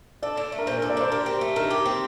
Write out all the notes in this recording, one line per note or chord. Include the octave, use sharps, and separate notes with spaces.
A4 D5
D4
A3
A#4
A#2 C5
A#4
A4
D5
D4 C5
G4 A#4
C4
A3
D#3 A#4
G4
C4